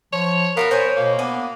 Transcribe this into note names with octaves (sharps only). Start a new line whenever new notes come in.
F3 C#5
B3 F#4 A4 A#4 F5
B3 C5 C#5 G#5
B2 A#3
B3 D4 G#5